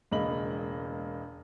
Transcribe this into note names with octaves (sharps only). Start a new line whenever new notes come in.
E1 C#2 A#3 D#5 B5 F#7